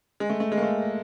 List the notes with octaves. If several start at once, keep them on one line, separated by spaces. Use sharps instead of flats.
G#3
A3
A3
G#3
A#3
A3